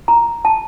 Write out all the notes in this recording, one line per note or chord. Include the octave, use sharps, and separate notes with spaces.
A#5
A5